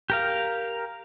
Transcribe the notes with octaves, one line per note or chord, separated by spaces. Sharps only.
G4 A#4 F5